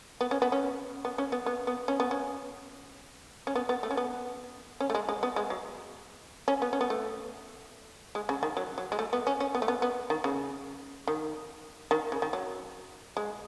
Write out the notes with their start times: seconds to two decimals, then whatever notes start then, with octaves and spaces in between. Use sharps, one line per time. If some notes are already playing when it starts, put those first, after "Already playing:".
0.21 B3
0.31 C#4
0.42 B3
0.52 C#4
1.05 B3
1.18 C#4
1.32 B3
1.46 B3
1.67 B3
1.88 C#4
2.00 B3
2.11 C#4
3.47 C#4
3.55 B3
3.69 B3
3.83 A3
3.91 C#4
3.97 B3
4.80 C#4
4.90 A3
4.95 G#3
5.09 G#3
5.23 B3
5.36 G#3
5.50 F#3
6.48 C#4
6.62 B3
6.73 C#4
6.81 B3
6.90 A3
8.15 G#3
8.29 C#3
8.43 D#3
8.57 F#3
8.78 F#3
8.92 G#3
8.99 A3
9.13 B3
9.27 C#4
9.40 C#4
9.55 B3
9.62 A3
9.68 B3
9.82 B3
10.10 D#3
10.24 C#3
11.08 D#3
11.91 D#3
12.12 C#3
12.22 D#3
12.33 F#3
13.17 G#3